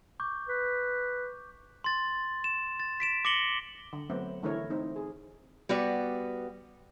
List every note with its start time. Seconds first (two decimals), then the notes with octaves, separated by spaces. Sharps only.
0.20 C#6 D6 G6
0.49 B4
1.84 C6 A6
2.44 E7
2.80 A6
3.00 B6 D7 E7
3.25 D6 A#6 C#7 F#7 G7
3.93 D3
4.10 F#3 A3 B3 C4
4.42 D3 E3 A3 E4 A#4 C#5
4.70 A3 C4 D#4
4.96 G#4
5.69 G3 B3 F#4 D5